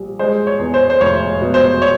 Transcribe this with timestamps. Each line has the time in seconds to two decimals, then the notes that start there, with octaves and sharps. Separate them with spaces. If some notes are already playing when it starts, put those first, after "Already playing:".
Already playing: A#1 G3
0.19 G#3 C5
0.47 C#5
0.59 E2
0.74 C5
0.90 C5
1.01 F1 C#5
1.41 B2
1.54 C5
1.82 C#5